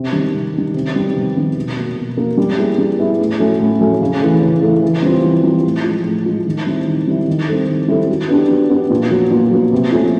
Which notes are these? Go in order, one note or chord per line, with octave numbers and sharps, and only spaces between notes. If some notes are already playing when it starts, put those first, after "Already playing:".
Already playing: C3
D#3 G3
C3
D#3 G3
C3
D#3 G3 B3
C3
D#3 G3 B3
B2
F#3 A#3
B2
F#3 A#3
G3
B3 E4 G#4
G3
B3 E4 G#4
A2
F#3 A3 C#4
A2
F#3 A3 C#4
C#3
E3 A3
C#3
E3 A3
E3
G3 C4 F4
E3
G3 C4 F4
A2
F3 G#3
A2
F3 G#3
D#3
G3 C4 E4
D#3
G3 C4 E4
D#3
G3 C4 E4 A4
D#3
G3 C4 E4 A4
F#3
B3 D4 G4
F#3
B3 D4 G4
A#2
F#3 B3
A#2
F#3 B3
C3
F3 A3 C#4